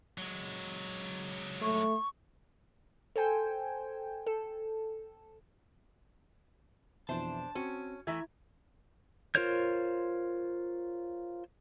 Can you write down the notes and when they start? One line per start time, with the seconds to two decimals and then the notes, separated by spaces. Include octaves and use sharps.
0.18 F#3 G#3
1.62 A3 C#6
3.16 A4 C5 G5 G#5
4.27 A4
7.09 F2 B2 E3 D4 C5 A5
7.55 C4 C#4 F#4
8.07 E3 A3 E4 E5 A#5 G#6
9.35 F4 A#4 C5 C#5 G6